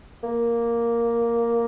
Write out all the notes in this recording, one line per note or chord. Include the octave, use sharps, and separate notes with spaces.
A#3